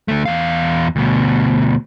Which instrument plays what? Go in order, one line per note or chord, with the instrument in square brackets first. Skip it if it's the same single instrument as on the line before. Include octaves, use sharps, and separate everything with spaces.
[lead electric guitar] D3 A3
E2 F5
D2 B2